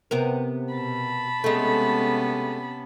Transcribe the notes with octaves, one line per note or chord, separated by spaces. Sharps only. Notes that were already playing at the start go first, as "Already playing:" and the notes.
C3 B3 A#4
B2 A5 B5
C3 G#3 A3 B3 C#4